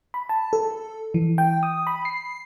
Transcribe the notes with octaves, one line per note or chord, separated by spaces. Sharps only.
B5
A5
A4
E3
G5
D#6
B5
C7